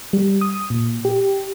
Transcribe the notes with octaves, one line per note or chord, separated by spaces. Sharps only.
G3
D#6
A#2
G4